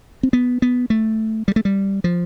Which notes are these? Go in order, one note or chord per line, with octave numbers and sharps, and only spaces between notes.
C4
B3
B3
A3
G3
A3
G3
F3